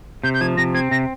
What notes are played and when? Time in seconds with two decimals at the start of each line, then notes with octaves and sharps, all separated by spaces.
0.23 C3 G6
0.34 G6
0.41 F3 G#6
0.57 C3 A#6
0.74 C4 G#6
0.91 C3 A#6